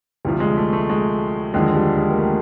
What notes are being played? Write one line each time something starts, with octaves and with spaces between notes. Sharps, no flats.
D2 C3 F3 G3
G#3
A3
A3
G#3
D#2 D3 F3 G#3
G3
G#3
A#3
A3